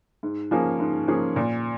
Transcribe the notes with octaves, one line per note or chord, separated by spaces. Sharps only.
G#2
F3 A#3 C#4 G#4
G#2
F3 A#3 C#4 G#4
A#2